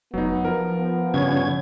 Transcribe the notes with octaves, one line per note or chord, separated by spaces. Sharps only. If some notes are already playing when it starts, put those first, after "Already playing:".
F1 F#3 B3 D#4
F3 A#4
B3
G2 C#3 C#4 G#6